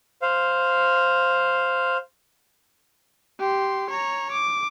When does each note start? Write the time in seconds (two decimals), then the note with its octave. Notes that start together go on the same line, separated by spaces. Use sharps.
0.22 C5 F5
3.39 G4 C6
3.90 C#5 A#5
4.32 D6